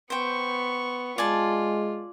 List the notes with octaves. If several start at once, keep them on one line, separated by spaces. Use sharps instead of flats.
B3 C5 G5 C#6
G#3 F4 D5 G#5 A5